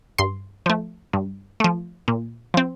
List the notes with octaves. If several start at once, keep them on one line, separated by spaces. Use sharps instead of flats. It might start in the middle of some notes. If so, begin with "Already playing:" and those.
G2 C6
F3 A3
G2
F3 A3
A#2
F3 C4